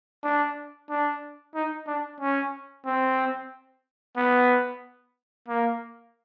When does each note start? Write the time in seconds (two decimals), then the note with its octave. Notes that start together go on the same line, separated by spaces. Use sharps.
0.23 D4
0.90 D4
1.55 D#4
1.87 D4
2.20 C#4
2.86 C4
4.17 B3
5.48 A#3